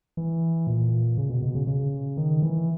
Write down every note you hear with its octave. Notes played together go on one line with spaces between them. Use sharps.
E3
A#2
C#3
B2
B2
C#3
C#3
D#3
E3